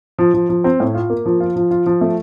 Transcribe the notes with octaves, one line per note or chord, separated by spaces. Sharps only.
F3
F3
F3
C4
A2
F4
A#3
F3
F4
F3
F4
F3
A3